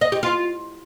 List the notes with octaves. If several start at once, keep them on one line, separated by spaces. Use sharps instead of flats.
D#5
G4
F4